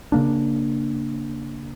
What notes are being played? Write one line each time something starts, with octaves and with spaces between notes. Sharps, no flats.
C#3 A#3 D4